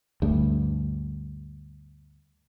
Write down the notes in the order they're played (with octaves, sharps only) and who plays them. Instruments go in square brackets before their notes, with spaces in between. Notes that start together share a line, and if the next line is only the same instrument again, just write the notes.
[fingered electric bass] D2 G2